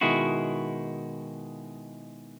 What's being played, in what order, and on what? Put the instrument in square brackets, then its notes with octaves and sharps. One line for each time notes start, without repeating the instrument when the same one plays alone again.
[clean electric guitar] B2 D#3 G#3 E4 F#4